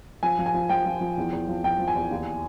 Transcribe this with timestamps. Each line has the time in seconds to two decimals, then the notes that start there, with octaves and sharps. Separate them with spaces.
0.23 F3 G#5
0.39 F3
0.46 G#5
0.54 F3
0.69 F3 G5
0.86 F3
1.01 F3
1.17 E2
1.32 E2
1.49 F3
1.64 F3 G5
1.79 F3
1.88 G#5
1.95 E2
2.11 D#2